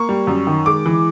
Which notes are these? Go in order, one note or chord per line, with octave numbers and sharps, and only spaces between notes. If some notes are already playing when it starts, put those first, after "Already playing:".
Already playing: A#3 C#6
G3
F#2
D#3
G#3 D6
E3